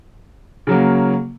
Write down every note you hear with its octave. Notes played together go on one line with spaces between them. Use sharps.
C#3 F#3 A#3